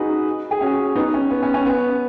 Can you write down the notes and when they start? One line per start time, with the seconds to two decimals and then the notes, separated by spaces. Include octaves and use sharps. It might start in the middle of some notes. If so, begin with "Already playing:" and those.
Already playing: D#4 F#4 G#4 B4
0.51 G#4
0.61 C#4 F#4
0.96 B3 D#4
1.14 C#4
1.30 B3
1.43 C#4
1.54 C#4
1.66 B3